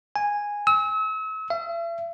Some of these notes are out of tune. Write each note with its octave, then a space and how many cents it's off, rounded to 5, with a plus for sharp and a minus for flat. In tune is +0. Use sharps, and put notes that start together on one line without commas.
G#5 -10
E6 -40
E5 +40